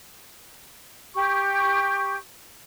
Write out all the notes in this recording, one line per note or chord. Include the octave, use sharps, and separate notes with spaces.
G4 C#6